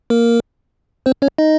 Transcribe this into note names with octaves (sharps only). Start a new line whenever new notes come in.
A#3 A#4
C4 C5
C#4 C#5
D#4 D#5